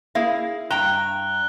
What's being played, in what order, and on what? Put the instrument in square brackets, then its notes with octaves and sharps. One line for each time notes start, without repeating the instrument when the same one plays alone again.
[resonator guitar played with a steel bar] E4 G#4 F5 [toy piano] E5
[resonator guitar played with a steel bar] G2 G5 A#5 [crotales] F#6 G7